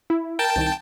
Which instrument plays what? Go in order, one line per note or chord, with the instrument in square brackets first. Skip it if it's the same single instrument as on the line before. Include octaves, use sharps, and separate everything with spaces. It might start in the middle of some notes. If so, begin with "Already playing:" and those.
[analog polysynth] E4
[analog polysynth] A#4 [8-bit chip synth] G5 A5
[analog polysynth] C2 D#3